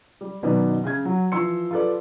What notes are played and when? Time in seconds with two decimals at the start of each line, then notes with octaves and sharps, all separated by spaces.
0.21 G3
0.42 F#1 B2 D#3 B3 D5
0.84 C#3 G#6
1.05 F#3
1.32 E3 F3 C6 E6 C#7
1.71 F4 G4 A4 B4 D5